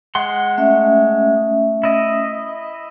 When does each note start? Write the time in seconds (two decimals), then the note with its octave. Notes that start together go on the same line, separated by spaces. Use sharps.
0.15 G#3 F#5 C6
0.57 A3 C#4 E5
1.83 E4 D#5